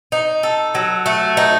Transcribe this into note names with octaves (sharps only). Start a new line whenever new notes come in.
D#4
A4
F#3
A3
D#4